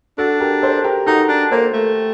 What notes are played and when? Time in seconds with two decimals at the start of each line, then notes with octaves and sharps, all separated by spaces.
0.18 D4 F#4 A4
0.40 G4 A#4
0.62 A4 C5
0.84 G4 A#4
1.06 D#4 F#4 A4
1.28 D4
1.51 A#3 A4 C5
1.73 A3